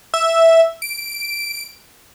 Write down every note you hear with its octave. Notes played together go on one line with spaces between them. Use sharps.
E5
D7